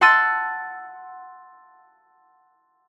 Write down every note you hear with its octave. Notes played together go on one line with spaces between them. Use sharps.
F#5 A5 C6 E6 A6 D#7